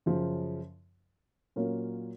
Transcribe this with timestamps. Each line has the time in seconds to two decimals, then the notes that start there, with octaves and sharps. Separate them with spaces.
0.06 F#2 C#3 F3
1.56 A#2 F#3 C#4 F4 A#4